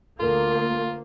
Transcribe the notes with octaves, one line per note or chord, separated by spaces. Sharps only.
D2 A#3 F4 A4 A#4